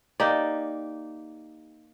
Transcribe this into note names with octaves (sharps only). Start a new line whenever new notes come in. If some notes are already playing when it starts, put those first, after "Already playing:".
A#3 D#4 G4 D5